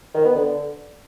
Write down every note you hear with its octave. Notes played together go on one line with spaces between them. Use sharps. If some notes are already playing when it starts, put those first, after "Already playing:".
D#3
B3
D3